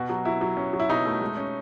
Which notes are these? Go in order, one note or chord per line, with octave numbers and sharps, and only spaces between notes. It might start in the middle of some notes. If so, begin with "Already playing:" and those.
Already playing: B2 F#4
F#3
F#3 E4
F#3
C#4
F#3
E4
B2 D#4
A3
G#3
C#4